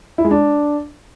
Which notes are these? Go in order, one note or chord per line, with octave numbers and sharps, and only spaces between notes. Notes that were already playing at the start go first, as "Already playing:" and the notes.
E4
G#3
D4